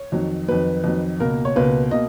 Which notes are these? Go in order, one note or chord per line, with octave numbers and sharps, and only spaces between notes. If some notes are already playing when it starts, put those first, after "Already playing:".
Already playing: C#5
F2 D#3 F#3
F2 D#3 F#3 B4
F2 D#3 F#3
C#2 B2 A#3 A#4
C#5
C#2 B2 A#3 B4
B2 A#3 D#5